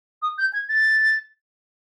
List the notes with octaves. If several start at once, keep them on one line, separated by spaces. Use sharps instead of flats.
D#6
G6
G#6
A6